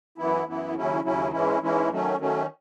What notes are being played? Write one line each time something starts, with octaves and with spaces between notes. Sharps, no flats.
F#2 E3 B3 E4
F#2 E3 B3 E4
D#2 C#3 F#3 C#4 E4
D#2 C#3 F#3 C#4 E4
G#2 E3 G#3 C#4 E4
G#2 E3 G#3 C#4 E4
D#3 F#3 A3 C#4
D#3 F#3 A3 C#4